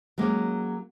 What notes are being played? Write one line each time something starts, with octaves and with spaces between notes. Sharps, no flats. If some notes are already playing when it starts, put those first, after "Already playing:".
F#3 G#3 A#3 C#4